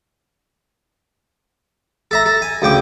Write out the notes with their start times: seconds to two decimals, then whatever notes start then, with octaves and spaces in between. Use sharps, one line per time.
2.11 A4 E5 A#5
2.26 A4
2.42 G#5
2.62 D2 C#3 G5 D6